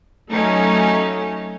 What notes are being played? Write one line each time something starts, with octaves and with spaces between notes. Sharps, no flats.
F#3 A3 C#4 D#4